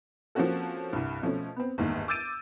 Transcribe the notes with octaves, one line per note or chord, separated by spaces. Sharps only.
F3 A#3 C4 C#4 F#4 A4
C2 G2
B2 F3 A3 C#4
B3 C4
G1 D#2 G#2
D6 E6 G6 A6 D7 D#7